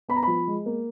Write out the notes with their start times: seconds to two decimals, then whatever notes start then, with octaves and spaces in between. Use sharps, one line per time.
0.09 B3 B5
0.16 A#5
0.23 F3 B5
0.47 G#3
0.66 A#3